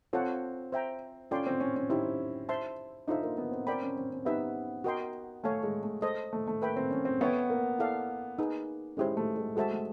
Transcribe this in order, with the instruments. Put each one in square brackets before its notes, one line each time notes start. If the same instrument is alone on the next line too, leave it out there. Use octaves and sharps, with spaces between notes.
[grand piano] C4 [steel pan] F4 A4 C#5 F#5 A5
[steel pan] C5 E5 G5 A#5
[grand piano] C#4 [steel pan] F4 A4 D5 G5 C6
[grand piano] C4
C#4
C#4
[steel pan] D#4 G4 C5 [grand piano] E4
[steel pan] C5 E5 A5 C6
[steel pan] D4 F4 A4 C5 E5 [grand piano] D#4
[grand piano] A#3
B3
C4
[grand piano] C4 [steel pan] A#4 D5 G5 B5
[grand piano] C#4
C4
C#4
[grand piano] B3 [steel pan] D#4 G4 B4 E5
[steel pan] F#4 A#4 D#5 G5 C6
[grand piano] A3 [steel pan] A4 C#5 F5 G#5
[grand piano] G#3
A3
[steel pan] A4 C5 D#5
[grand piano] A3
A3
[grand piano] A#3 [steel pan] B4 E5 G5 B5
[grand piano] C4
C#4
C4
[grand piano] B3 [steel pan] A4 C#5 E5 G5
[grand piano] A#3
[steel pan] E4 A4 D5 F5
D#4 G#4 B4
[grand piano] G#3 [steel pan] C#4 E4 G4 C5
[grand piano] A3
G#3
[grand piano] G#3 [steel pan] F#4 A4 C5 E5 A5
[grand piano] A3